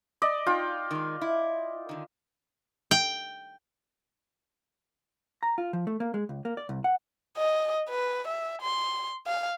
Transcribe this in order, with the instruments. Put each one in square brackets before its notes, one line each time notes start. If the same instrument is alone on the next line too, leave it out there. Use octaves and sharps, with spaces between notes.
[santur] D5 D#5
[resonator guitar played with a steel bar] D#4 [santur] F4 G5
[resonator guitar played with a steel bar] D#3 G#3
E4
D3 D#3
[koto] G5
[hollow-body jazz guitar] A#5
F4
F3
A3
A#3
G#3
C#2
A#3
D5
C2
F#5
[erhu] D#5
B4
E5
C6
F5